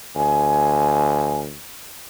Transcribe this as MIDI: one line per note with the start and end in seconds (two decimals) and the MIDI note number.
0.16 1.59 38
0.16 1.38 80